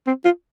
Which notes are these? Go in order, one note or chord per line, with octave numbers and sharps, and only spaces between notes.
C4
F4